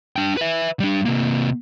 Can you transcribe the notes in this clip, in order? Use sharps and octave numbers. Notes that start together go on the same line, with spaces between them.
D4 G5
B4 E5
G3 D4
C3 A#3